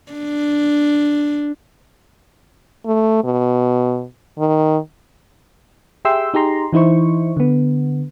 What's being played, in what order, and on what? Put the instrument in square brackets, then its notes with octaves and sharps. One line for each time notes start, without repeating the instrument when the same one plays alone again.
[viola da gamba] D4
[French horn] A3
B2
D#3
[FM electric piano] G4 G#4 E5 G5 C6 E6
D#4 G4 G#4 A#5 C6
E3 D#4 E4 C5 C#6
D3 B3